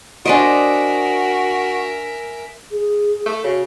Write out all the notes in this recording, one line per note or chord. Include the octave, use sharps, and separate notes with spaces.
D4 F#4 A#4 C5 D#5 E5 G#5 D7
G#4
A3
C#3 F#4